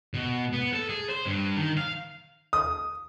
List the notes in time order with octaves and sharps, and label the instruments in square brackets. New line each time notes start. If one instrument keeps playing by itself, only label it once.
[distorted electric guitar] B2
B3
A4
G#4
C5
G2
D#3
F5
[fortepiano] D#6